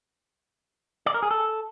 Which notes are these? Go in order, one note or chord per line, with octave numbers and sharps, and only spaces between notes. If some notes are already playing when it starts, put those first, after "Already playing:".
D5
A#4
G#4
A4